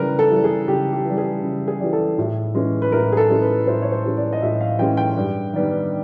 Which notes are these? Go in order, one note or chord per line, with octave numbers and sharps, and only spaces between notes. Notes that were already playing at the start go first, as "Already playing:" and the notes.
Already playing: C#3 E3 G3 A#4 B4
A4
E3 G3
G#4
C#3 G4
G4
E3 G3
G#4
C#3
G#4
E3 G3
A4
A2
E3 G#3 C#4
B4
A2 A#4
G#4
A4
E3 G#3 C#4
B4
A2 C5
C#5
C5
E3 G#3 C#4
D5
D#5
A2 E5
F5
E3 G#3 C#4 G5
G5
G2
D#3 G3 B3